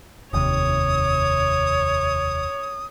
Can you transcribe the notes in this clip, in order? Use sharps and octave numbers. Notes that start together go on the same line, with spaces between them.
F1 D#2 C3 C#5 D#6